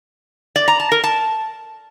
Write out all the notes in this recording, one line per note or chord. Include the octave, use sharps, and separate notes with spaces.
D5
A#5
A5
A#4
A5